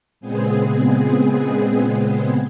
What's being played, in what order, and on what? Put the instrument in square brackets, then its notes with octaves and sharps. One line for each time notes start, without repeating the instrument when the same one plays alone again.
[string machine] A#2 C#3 G#3 B3 C4 G#4